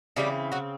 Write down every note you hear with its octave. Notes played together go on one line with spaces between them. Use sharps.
C#3 E3 G3 C4 G4
F#3 F#4